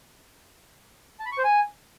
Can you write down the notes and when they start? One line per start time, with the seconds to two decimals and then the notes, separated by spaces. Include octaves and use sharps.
1.20 A5
1.26 B5
1.32 C#6
1.38 C5
1.44 G#5